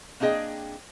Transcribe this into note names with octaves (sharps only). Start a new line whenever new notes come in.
A#3 C4 D4 G#4 D#5 G5